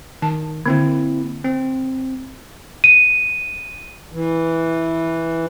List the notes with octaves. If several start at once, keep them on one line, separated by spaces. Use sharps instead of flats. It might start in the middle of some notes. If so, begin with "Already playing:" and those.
D#3 A5
D3 A#3 C4 E4
C4
D#7
E3